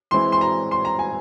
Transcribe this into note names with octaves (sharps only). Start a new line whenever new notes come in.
E3 G#3 C4 E4 C6
C6
A#5
C6
A#5
G#5